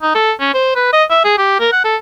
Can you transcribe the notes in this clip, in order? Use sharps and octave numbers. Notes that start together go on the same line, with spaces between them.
D#4
A4
C#4
C5
B4
D#5
E5
G#4
G4
A#4
F#5
A4